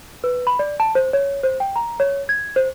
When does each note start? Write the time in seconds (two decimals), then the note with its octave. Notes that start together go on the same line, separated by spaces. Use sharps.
0.24 B4
0.47 B5
0.59 D5
0.80 A5
0.95 C5
1.13 C#5
1.43 C5
1.60 G5
1.76 A#5
2.00 C#5
2.29 G#6
2.56 C5